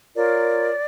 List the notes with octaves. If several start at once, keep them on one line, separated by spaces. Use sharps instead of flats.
F4 A#4 C#5 D5